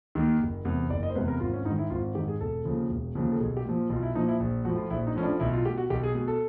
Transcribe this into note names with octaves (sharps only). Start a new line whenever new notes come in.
D#2 D#3
F#1
E2 C3
F#1 D5
D#5
C5
E2 C3 B4
A#4
G#1 F4
C#4
G#2 D#4
D#3
E4
G#1 F4
G#2 D#3 G4
G#4
E1 A4
D#2 C#3 F3
E1
D#2 C#3 F3
A4
B1 G#4
G4
A#2 F3
B1 F4
E4
A#2 F3 D#4
E4
A#1
A2 F3 F#4
F4
A#1 E4
D#4
A2 F3 C#4
D4
B1 E4
F4
B2 G4
F#4
B1 G4
G#4
B2 G#4
A4